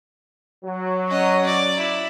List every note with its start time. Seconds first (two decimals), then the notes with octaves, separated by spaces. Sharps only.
0.64 F#3
1.08 C#4 D#5
1.46 D5
1.77 E4